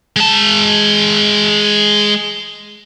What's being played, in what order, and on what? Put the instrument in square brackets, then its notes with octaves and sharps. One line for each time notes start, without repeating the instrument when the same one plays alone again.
[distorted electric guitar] G#3 A5